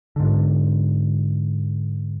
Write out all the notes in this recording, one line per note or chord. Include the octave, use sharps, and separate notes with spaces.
G#2 D3